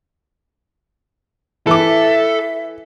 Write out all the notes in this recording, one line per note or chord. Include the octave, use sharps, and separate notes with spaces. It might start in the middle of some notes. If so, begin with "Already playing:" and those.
E3 A4 E5 D6